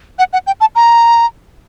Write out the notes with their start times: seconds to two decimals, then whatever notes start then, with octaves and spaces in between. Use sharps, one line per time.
0.19 F#5
0.33 F#5
0.47 G5
0.60 A5
0.75 A#5